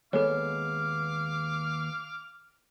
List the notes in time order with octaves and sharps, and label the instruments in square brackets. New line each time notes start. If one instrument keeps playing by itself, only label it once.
[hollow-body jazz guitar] D#2 G#3 B3 [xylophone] A4 C#5 [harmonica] F5 D6 F6